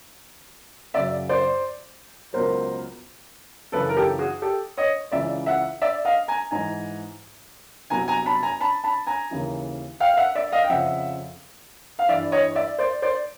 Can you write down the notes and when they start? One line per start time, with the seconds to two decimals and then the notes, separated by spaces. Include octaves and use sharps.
0.94 F#2 C#3 F#3 D5 E5
1.29 C5 D5
2.33 C#2 B2 F#3 A#4 C5
3.72 F#2 C#3 E3 A4 B4
3.89 A#4
3.97 G4 A4
4.19 F#4 G#4
4.42 G4 A4
4.77 C#5 D#5
5.12 C#2 C#3 E3 D5 E5
5.46 E5 F#5
5.82 D5 E5
6.05 D#5 F5
6.28 G#5 A#5
6.51 G#2 E3 G#5 A#5
7.90 C2 B2 F#3 G#5 A#5
8.08 G#5 A#5
8.26 A5 B5
8.43 G#5 A#5
8.61 A5 B5
8.84 A5 B5
9.07 G#5 A#5
9.31 D#2 C#3 E3
10.00 F5 G5
10.13 F5
10.17 E5 F#5
10.35 D5 E5
10.52 D#5 F5
10.64 G5
10.69 F2 C#3 F3 E5 F#5
11.99 F5
12.09 G2 E3 D5 E5
12.32 C#5 D#5
12.55 D5 E5
12.78 C5 D5
13.02 C5 D5